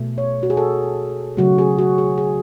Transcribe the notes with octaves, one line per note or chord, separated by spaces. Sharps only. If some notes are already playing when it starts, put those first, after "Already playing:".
Already playing: B2 A3
C#5
F#4
G#4
A4
C#3 F#3 A3 F#4
G#4
F#4
G#4
G#4